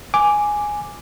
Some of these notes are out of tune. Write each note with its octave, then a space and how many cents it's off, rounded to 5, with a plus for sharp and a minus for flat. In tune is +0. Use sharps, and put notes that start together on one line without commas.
G#5 +0 D6 +0